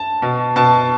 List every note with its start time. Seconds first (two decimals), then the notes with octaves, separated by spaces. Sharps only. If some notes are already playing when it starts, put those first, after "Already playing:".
Already playing: A5
0.22 B2
0.56 B2 A5